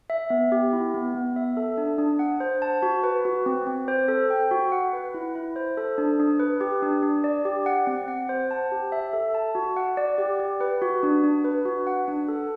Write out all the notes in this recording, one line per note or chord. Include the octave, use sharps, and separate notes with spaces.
E5
B3
G4
E4
B3
B3
E5
A4
D4
D4
F#5
C5
A5
F#4
B4
F#4
C4
C4
C5
A4
G5
F#4
F#5
B4
E4
E4
C5
A4
D4
D4
B4
G4
D4
D4
D5
G4
F#5
C4
F#5
C5
A5
G4
E5
A4
A5
F#4
F#5
D5
G4
G4
B4
F#4
D4
D4
B4
F#4
F#5
D4
A4